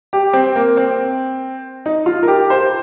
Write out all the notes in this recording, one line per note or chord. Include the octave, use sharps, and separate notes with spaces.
G4
C4
A#3
C4
D#4
F4
A#4
G4
C5